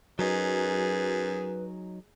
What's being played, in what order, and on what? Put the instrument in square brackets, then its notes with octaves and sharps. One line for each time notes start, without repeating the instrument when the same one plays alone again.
[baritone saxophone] F#2 [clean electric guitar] F#3 D#4 [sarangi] G#4 [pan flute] B4